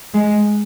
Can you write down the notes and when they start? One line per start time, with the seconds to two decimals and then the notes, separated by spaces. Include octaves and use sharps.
0.14 G#3